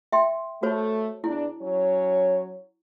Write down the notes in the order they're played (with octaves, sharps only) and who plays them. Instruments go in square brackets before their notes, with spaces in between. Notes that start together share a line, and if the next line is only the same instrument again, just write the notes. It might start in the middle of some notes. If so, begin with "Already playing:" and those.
[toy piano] E5 G5 C6
[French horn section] A3 [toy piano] F#4 C5 C#5
[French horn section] E2 D4 [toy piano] E4
[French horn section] F#3 C#4 C#5